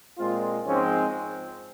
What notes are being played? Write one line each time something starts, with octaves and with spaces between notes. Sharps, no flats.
A#2 G#3 C4 F4
G#2 F3 G#3 C4 C#4